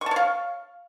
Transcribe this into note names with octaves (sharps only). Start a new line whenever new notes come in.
C#5 F5 A5 C#6